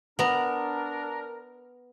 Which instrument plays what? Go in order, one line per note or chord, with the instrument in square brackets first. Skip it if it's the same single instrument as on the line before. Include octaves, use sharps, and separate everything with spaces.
[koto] B3 A#5 [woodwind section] D4 A#4